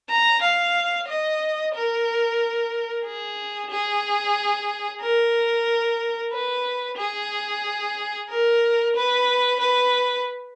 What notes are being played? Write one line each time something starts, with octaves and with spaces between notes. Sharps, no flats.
A#5
F5
D#5
A#4
G#4
G#4
A#4
B4
G#4
A#4
B4
B4